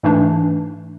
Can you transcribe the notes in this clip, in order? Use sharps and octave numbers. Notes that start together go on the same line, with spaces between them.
G#2 E3 A3 D4